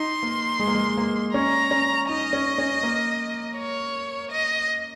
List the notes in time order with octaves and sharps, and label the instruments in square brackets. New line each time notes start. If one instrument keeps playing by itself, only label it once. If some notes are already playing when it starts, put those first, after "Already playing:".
Already playing: [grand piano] D#4 [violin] C6
[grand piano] A#3
G#3
A#3
G#3
A#3
[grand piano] C#4 [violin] A#5
[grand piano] C#4
[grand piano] D#4 [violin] D#5
[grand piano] C#4
C#4
A#3
[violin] C#5
D#5